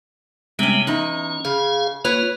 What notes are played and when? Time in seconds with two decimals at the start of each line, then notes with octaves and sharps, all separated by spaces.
0.59 C3 G3 G#3 B3 C#4
0.87 E2 C#4 D#4
1.45 C#3 G#4 F5
2.05 A#3 F4 B4 C#5